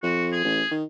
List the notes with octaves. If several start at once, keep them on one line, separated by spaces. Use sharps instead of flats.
F2 F#4
G#4
A1
D#3